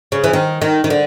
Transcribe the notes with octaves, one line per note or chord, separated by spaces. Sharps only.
C#3
E3
D#3
D#3
D#3
D3